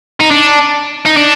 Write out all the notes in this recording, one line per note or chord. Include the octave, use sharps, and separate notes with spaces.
D#4
D4
D#4
D4